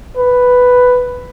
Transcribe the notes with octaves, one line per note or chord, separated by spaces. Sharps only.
B4